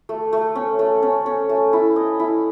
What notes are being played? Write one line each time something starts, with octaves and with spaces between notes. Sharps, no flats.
A3
A3
C#4
A3
C#4
C#4
A3
E4
D#5
E4